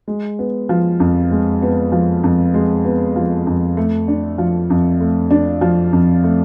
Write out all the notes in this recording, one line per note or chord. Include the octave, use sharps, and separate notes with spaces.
G#3
B3
F3
F2
G#3
B3
F3
F2
G#3
B3
F3
F2
A3
D4
F3
F2
A3
D4
F3
F2
A3